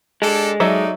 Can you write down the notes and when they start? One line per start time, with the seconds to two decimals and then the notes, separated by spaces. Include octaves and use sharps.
0.22 G#3 D4 G4 A4
0.60 F#3 D#4 A4 D5 E5